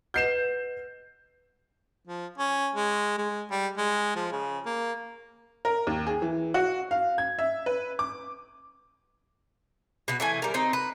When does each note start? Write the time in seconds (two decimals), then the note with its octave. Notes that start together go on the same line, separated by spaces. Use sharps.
0.14 B4 D#5 F#5 G6 C7 E7
2.07 F3
2.38 C#4
2.75 G#3
3.18 G#3
3.51 G3
3.77 G#3
4.15 F3
4.32 C#3
4.66 A#3
5.65 A#4
5.87 D#2
6.07 G#4
6.22 E3
6.54 F#4
6.91 F5
7.18 G#6
7.39 E5
7.66 B4
7.99 D6
10.08 B2 F#4
10.20 E3 A3 G#5
10.42 G3 A#4
10.54 C4 D#4
10.73 B4